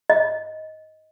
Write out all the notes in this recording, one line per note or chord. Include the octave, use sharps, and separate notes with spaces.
D#5